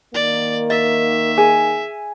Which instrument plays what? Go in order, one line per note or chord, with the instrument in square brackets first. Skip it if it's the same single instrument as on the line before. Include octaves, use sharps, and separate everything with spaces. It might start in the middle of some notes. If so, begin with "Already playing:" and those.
[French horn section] D#3 A#3 [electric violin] D5
[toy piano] D#5 [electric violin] E5
[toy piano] G#4 [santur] G#5